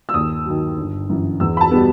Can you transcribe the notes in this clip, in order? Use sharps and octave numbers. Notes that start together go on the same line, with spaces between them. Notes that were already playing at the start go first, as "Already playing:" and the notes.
E6
D#2 D#6
D#3 F#3
G1
F#2 E3
E2 E6
B5
A5
B2 G3 B3